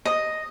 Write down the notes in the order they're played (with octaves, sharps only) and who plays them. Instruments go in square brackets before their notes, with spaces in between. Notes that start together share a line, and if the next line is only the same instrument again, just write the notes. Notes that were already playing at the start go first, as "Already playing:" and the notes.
[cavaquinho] D#5